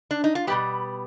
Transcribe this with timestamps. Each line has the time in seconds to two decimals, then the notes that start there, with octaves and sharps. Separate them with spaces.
0.11 D4
0.24 D#4
0.35 F4
0.47 B2 G3 B3 G4